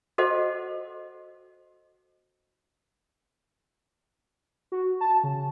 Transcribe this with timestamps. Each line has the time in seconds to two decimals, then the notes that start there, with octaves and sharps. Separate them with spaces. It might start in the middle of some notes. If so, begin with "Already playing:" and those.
0.18 F#4 A4 C5 D#5 F#5
4.72 F#4
5.01 A5
5.23 C#3